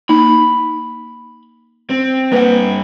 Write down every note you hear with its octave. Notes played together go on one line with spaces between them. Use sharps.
A#3 D#4 B5
C4
G2 A#3 B4 F#5